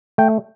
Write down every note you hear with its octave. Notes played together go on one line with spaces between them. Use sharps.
A3 G5